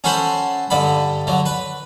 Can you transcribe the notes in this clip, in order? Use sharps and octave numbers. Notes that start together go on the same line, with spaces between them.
C#4 F#4 A4 C5 B5
G2 D3 A4 B5
D3 F#3
B4